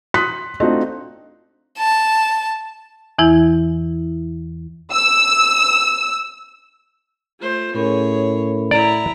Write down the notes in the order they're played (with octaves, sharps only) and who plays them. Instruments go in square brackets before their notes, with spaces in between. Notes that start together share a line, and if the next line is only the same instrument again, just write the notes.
[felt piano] C6 D#6 F#6 B6
A3 C4 D4 D#4 F4 F#4
[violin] A5
[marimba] E2 E3 E4
[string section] E6
[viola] A3 C5 [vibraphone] F4
[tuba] A2 [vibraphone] C#4 A#4 B5 [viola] G#4 C#5
[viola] E4 A#5 [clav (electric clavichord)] D5